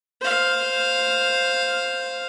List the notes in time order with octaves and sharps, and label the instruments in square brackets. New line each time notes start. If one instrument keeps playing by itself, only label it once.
[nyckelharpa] C5 F5